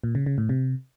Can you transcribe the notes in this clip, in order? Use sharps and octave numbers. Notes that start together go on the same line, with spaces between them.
A#2
C#3
C#3
A2
C3